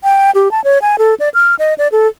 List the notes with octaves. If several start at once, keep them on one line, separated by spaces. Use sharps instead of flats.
G5
G4
A5
C#5
G#5
A4
D5
F6
D#5
D5
A4